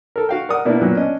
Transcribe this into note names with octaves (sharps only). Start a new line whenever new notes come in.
A4 A#4
F#4 F5 G5
A#4 D5 F#5 D#6
B2 A#3 B3 D4 E4
A#2 F#3 B3
C#4 D4 D#5